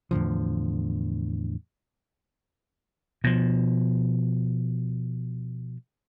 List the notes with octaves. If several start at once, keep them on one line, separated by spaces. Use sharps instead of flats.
E2 A2 D3 F3
B2 F3